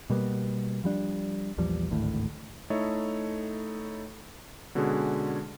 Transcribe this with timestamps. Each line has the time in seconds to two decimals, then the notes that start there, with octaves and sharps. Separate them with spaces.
0.10 B2 G3 A#3 B3
0.84 F3 G3 D4
1.58 A#1 E2 F3 G3
1.91 G#1 D2 A2
2.70 A3 D#4 E4 A4 C#5 D#5
4.75 B2 D3 G#3 C#4 F#4 G#4